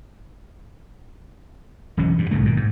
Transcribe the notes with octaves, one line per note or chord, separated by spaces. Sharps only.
E1 E3 F#3 C#4
G2
B1 G#2 C#3 A3
A#2 D#3
G#2